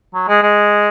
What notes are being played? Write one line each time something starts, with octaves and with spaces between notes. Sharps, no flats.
F#3
G#3
G#3